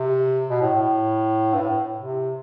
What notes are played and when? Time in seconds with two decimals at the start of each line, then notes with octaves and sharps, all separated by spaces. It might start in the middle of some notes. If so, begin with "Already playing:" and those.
Already playing: C3
0.50 B2
0.62 A2
0.74 A2
1.54 G2
1.61 A2
1.98 C3